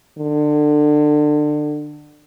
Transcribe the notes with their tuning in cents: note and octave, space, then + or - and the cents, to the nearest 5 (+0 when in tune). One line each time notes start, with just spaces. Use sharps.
D3 +25